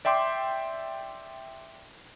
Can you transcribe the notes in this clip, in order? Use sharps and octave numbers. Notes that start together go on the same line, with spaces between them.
D5 E5 G5 C6 D6